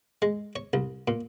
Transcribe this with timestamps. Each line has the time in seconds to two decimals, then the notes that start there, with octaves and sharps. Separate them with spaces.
0.22 G#3
0.56 C#5
0.73 C2
1.08 A#2